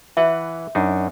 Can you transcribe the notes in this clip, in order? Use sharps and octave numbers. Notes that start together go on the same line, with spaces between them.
E3 B4 E5 F#5
F#2 D4 D#4